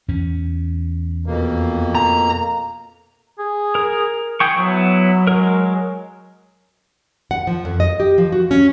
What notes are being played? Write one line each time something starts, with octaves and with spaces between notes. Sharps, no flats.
E2 C#4
F2 B2 A#3
A#5
G#4
A#4
G#4 G5 C#6
F#3 B3 E4
G#3 A#4
F#5
F3
F2
D#5
G4
F3
F#4
C#4